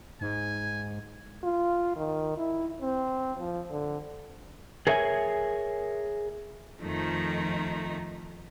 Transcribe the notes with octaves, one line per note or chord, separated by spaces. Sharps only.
G#2 G#5
F4
D#3
E4
C4
F3
D3
G#4 A#4 C#5 E5 F5 G#5
F2 D#3 F3 A3 D#4